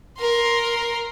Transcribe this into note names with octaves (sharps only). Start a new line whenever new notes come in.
A#4 C6